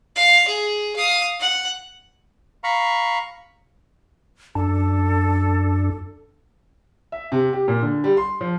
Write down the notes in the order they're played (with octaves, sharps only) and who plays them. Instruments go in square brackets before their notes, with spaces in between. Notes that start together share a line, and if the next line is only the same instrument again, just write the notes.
[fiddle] F5
G#4
F5 D#6
F#5
[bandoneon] F5 A#5 B5 C#6
[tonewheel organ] F#2 D4 [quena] A4
[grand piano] E5
C3
G4
A#2
D3
G3
C6
F3